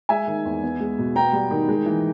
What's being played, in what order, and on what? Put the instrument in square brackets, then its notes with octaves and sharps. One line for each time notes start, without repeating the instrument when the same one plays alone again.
[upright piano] G#3 E5 G#5
D#3
E2
B3
G#3
B2
B3 G5 A#5
G3
D#3
G#3
E3